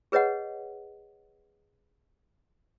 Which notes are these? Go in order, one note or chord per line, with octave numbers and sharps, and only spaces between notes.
G#4 B4 C#5 D#5 F#5